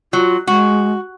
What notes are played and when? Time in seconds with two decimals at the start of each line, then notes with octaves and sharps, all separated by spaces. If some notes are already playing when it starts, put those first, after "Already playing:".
0.13 F#3 F4
0.47 G#3 F#4